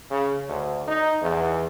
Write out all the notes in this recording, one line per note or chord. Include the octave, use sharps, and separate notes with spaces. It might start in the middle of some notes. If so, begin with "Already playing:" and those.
C#3
D2
D#4
E2